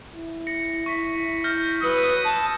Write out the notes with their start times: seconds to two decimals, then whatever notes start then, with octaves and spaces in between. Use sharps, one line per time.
0.16 E4
0.47 A#6 C#7
0.86 C#6 B6
1.44 F6 G6 A#6
1.83 F#3 B4 D#6 E6 C#7
2.24 A5